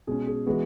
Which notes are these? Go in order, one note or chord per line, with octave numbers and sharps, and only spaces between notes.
B2 G#3 C#4 G#4
G#4
E3 G#3 B3 F#4